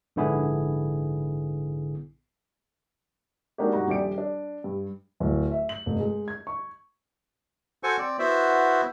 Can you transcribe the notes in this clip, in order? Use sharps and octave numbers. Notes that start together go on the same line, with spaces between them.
A#1 G#2 D3 B3 E4 G#4
G#3 A#3 D4 D#4 F#4 G4
G2 D#4 F#4 F#5 A#5
D#1 A#1 G4 D5 D7
D4
G2
D1
E5
F#7
F1
G#3
G#6
C#6
F#4 A4 C5 G#5 C#6
C4 D5
B3 E4 F#4 C5 E5